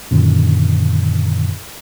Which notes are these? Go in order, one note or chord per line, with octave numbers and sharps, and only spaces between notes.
F#2 A#2 D3 D#3